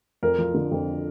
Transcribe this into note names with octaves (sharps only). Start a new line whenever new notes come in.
F2 A#4
F3
D3
F2